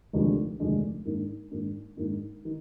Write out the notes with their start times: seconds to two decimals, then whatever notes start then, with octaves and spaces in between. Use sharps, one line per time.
0.13 F1 D#2 D3 G#3 D4
0.60 F1 D#2 D3 G#3 D4
1.05 G#2 D#3 A#3 D4
1.51 G#2 D#3 A#3 D4
1.97 G#2 D#3 A#3 D4
2.45 D#3